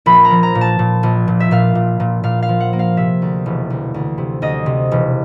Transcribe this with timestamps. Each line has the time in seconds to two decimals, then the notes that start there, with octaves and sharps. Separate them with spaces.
0.06 A#1 B5
0.25 A#5
0.31 F3
0.43 A#5
0.55 A#2
0.61 A5
0.79 A#2
1.03 A#1
1.28 A#2
1.40 E5
1.51 A#2 F5
1.75 A#2
2.00 A#2
2.23 A#2 F5
2.42 F5
2.49 F3
2.60 F#5
2.73 A#3
2.79 F5
2.97 C3 E5
3.22 D2
3.46 E1
3.70 D2
3.94 D2
4.18 C3
4.42 D2 D#5
4.66 C3
4.91 E1